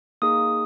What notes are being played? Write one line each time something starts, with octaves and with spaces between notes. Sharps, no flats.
A#3 D#4 G#4 D#6